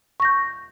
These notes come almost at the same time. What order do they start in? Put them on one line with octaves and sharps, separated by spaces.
C#6 A#6 G6